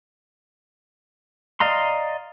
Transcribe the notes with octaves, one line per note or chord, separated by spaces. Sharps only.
D5 D#5 F5 A#5 C6